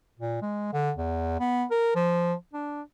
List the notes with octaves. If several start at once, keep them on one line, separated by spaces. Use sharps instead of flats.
A#2
G#3
D3
E2
B3
A#4
F3
D4